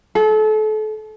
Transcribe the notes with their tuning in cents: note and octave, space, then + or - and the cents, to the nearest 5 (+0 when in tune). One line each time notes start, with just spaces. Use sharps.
A4 -35